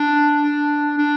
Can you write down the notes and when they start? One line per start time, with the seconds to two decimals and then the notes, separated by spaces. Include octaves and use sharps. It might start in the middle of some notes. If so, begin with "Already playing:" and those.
Already playing: D4
0.42 D4
0.98 D4